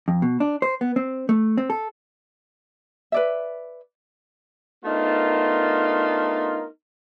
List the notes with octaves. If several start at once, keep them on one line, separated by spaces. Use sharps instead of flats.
F2
B2
D4
C5
B3
C4
A3
C4
A4
B4 D5 E5
A3 B3 D4 D#4 F4 A#4